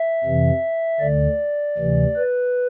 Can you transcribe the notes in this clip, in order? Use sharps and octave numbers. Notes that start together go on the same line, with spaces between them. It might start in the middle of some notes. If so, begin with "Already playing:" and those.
Already playing: E5
F2 C3 E3
D2 D3 D5
D2 C3 E3
B4